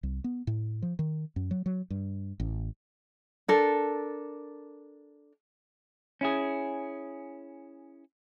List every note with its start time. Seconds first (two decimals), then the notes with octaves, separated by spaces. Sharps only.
0.03 C2
0.24 B3
0.47 A2
0.82 F3
0.99 D#3
1.36 F#2
1.51 F#3
1.66 F#3
1.90 G2
2.40 A1
3.48 D4 A4 A#4
6.21 C#4 E4 G#4